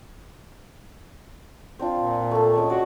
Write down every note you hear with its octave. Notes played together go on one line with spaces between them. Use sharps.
C4 D4 F4
A#2
A3 A4
G#3 C#4 E5
F#4 G#4 D5